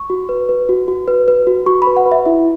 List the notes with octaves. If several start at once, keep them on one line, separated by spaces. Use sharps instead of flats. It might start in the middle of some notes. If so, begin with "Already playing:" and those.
Already playing: C#6
F#4
B4
B4
F#4
F#4
B4
B4
F#4
F#4 C#6
B5
B4
F#5
B4
E5
E4 E5